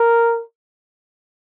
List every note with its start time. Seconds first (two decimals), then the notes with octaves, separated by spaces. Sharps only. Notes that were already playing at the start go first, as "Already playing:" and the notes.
Already playing: A#4